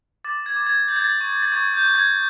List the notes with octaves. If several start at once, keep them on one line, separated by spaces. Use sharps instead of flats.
D6 A6
G#6
D6
G#6
G6 A6
G#6
A6
C#6
A6
C#6 G#6
G6
C#6
G#6